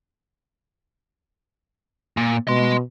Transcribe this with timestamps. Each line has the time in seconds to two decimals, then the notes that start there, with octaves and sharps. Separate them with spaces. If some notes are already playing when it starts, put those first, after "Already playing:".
2.17 A#2
2.47 B2 D#5 C6